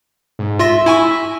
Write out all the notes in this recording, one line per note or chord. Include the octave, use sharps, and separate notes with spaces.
G#2
F4 E5 C6 A#6
E4 G#5 C#6